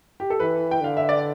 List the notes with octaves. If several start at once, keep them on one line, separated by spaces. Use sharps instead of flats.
G4
A4
E3 B4
G5
D3 F5
E5
D5